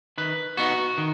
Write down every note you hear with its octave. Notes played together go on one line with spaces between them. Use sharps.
D#3 B4
B3 D#4 F#4
D#3